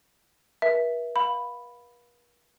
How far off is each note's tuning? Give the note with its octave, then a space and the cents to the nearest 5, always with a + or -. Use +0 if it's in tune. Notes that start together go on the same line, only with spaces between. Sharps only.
B4 -45 E5 +0
F5 +25 B5 +0